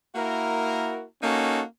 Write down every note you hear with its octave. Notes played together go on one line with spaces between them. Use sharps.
A#3 E4 F#4 A#4
A#3 C#4 D#4 F#4 A4